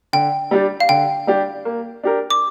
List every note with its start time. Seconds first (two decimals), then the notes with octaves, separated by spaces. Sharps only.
0.13 D3 G5
0.51 G3 D4 G4
0.80 F5
0.89 D3 G5
1.27 G3 D4 G4
1.65 A#3
2.03 D4 G4 A#4
2.30 D6